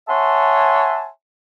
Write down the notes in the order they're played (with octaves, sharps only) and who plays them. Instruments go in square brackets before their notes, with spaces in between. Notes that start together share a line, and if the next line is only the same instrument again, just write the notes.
[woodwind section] C#5 E5 F#5 G#5 A5 C6